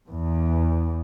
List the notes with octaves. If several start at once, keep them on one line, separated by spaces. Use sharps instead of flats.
E2